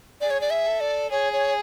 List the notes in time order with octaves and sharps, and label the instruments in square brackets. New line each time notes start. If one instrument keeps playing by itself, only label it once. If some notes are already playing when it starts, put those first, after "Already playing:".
[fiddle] G#4 [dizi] D5
[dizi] C#5
D5
E5
[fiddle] A4
[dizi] D5
[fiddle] G#4 [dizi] C#5
[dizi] C#5